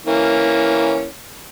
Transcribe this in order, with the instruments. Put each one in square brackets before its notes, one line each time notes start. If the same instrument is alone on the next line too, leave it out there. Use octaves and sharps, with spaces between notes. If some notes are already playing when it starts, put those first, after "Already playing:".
[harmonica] E3 A#3 C#4